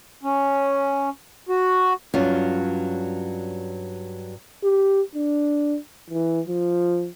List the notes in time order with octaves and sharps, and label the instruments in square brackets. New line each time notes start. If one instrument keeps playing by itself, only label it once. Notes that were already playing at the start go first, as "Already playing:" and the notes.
[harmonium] C#4
F#4
[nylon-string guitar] G2 F#3 C#4 F4
[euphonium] G4
D4
E3
F3